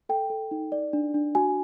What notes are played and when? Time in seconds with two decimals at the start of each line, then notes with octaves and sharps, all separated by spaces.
0.09 A4 G5
0.30 A4
0.51 D#4
0.72 D5
0.93 D4
1.14 D4
1.35 F#4 G#5